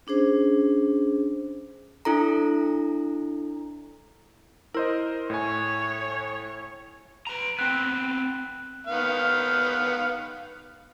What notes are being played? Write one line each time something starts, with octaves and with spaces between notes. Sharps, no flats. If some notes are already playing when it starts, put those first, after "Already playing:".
C#4 D4 G#4 C5
D4 E4 A4 A#5
E4 A#4 C5 D#5
A2 C#5 G#5
B4 A#5
B3 C4 F#6
D#3 B3 F5